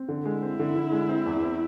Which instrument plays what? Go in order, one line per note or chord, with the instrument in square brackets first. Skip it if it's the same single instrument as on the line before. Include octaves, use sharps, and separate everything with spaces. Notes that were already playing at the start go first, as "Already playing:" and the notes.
Already playing: [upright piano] C4
D3
[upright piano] G#3 [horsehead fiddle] E4
[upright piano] C4
D3
D3
G#3
C4
E2
C4